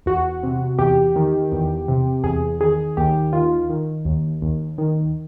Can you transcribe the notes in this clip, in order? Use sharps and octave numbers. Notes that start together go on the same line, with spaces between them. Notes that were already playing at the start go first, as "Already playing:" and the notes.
E2 F#4
C3
E2 G4
D#3
E2
C3
E2 G#4
D#3 G#4
D#2 G4
D#3 F4
D#3
D#2
D#2
D#3